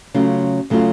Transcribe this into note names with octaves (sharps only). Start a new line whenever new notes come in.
C#3 F#3 A3 C#4 F4
C#3 F#3 A3 C#4 F4